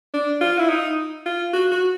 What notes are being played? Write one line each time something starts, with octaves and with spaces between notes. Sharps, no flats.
D4
F4
E4
D#4
F4
F#4
F#4